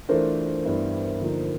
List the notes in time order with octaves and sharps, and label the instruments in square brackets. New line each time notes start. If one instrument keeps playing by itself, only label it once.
[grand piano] E3 A3 D4 F4 [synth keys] A#4 C5
[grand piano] G2 E3 G3 B3 E4
D3 F3 A#3 D#4